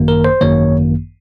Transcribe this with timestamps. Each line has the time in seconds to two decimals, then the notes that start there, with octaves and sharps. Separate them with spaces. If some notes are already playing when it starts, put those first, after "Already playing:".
Already playing: G#1 F#2 D#3 A#3
0.08 A#4
0.24 C5
0.41 G#1 F#2 D#3 A#3 C#5